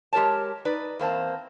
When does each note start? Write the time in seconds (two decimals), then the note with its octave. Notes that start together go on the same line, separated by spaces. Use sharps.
0.13 G#3 G4 A#4 C#5 A5
0.65 D#4 B4 D5
0.99 E2 A#3 C4 A5